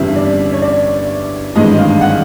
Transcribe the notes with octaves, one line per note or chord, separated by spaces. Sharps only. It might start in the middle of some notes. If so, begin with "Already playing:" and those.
Already playing: G1 F2 C#3 E3 G3 E5
D5
C#5
D5
G#1 G2 E3 G#3 D#5
F5
F#5